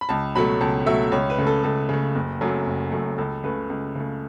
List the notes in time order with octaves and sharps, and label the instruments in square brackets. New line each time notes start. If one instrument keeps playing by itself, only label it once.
[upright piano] B5
C#2 A5
B2 F#3 A3 B5
C#2 A5
B2 F#3 A3 E5
C#2 C#5
B4
C#3 A3
A4
C#2 A4
C#3 A3
F#1
F#2 F#3 A3
F#1
F#2 F#3 A3
C#2 A4
C#3 A3 B4
C#2
C#3 A3